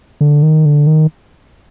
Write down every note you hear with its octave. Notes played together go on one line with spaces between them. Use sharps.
D3
D#3
D3
D#3